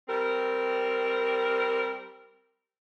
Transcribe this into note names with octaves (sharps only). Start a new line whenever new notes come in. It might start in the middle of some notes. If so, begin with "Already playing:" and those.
G3 C4 A#4